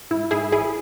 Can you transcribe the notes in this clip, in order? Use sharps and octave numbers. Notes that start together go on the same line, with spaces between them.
G#2 E4
G#2 E4 G#4
A1 E4 G#4